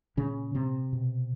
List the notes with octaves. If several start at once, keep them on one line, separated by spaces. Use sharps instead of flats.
A#2 C#3 C#4
C3 C4
B2